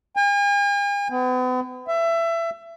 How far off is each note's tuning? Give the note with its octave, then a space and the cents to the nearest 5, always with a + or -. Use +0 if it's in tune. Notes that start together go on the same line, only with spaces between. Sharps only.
G#5 -45
B3 +40
E5 +25